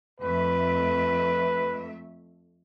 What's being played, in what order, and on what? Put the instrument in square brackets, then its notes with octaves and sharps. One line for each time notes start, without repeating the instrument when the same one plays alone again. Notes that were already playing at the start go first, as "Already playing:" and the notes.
[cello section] F2 A3 E5 [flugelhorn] B4